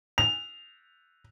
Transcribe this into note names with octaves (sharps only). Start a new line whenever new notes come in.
F7